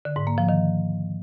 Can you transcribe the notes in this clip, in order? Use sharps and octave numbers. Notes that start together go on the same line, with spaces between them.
D3
G#2
A#3
F3
D#3